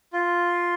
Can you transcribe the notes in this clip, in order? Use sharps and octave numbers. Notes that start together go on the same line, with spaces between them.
F4